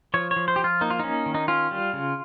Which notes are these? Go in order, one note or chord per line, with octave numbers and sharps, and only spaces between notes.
F3 C#5
C#5
F3
C5
F3 G4
F4
A#3 D#4
F4
C#4 D#4
D#3
D#4
C#4 F4
G3
C#3